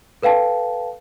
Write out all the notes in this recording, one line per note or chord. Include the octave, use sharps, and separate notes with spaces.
A4 B4 F5 G5 A5